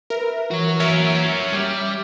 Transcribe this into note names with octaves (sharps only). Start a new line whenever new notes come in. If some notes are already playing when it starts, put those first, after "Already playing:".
A#4 B4 E5
E3 F#4 C#5
E3 A#3 C#4 A#4 E5
G3 D6 F6 B6